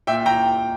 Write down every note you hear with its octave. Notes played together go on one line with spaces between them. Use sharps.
A#2 E5 G5
G5 A#5